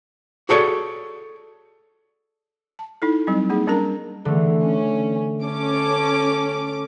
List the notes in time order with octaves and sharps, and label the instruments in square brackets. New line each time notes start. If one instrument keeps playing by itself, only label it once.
[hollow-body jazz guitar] F#4 G#4 A4 C#5 D5
[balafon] A5
D#4 E4 A4
F#3 G3 C4 D#4
A#3 D#4 G#4
G3 C#4 D4 A#4 A#5
[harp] D3 A3 [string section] E3
[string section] C#4
C#4 A4 D6